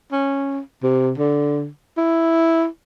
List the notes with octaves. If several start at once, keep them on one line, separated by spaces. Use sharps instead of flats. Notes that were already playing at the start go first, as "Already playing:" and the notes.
C#4
C3
D3
E4